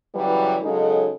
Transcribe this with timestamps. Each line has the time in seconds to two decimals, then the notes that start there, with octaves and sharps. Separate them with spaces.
0.14 C#3 E3 F#3 G3 B4
0.62 C#3 F#3 G#3 D#4 A4